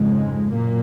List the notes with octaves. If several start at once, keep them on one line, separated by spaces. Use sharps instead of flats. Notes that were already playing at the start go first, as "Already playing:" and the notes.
Already playing: F2 G#2 C#3 G#3
F#2 A#2 A#3